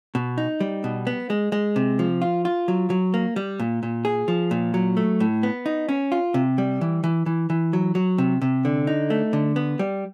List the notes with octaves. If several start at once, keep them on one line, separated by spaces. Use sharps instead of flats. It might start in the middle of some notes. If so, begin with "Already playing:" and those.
B2
D#4
G3
B2
B3
G#3
G#3
C3
F3
F4
F4
F#3
F#3
A#3
G3
A#2
A#2
G#4
F3
A#2
F#3
A3
A2
B3
D#4
C#4
F4
C3
G3
E3
E3
E3
E3
F#3
F#3
C3
C3
D3
D#4
A3
D3
B3
G3